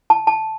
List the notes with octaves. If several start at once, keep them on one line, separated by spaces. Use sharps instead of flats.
A5
A5